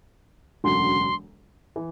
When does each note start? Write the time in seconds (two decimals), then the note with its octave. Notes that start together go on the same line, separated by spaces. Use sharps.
0.64 E1 D2 C#3 F#3 C6
1.76 E3